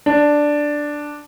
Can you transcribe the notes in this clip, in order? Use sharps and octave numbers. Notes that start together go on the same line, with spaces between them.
D4